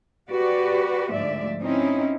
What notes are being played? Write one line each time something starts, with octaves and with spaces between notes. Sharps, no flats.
F#4 G4 B4 D5
D2 G#2 F3 D5 E5
C4 C#4 D#4 E4